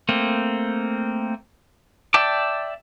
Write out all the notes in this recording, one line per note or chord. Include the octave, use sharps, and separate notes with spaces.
A3 A#3 C4
D5 E5 G5 A5 D6